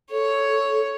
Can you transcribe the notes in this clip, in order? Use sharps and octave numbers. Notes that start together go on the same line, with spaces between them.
A4 C#5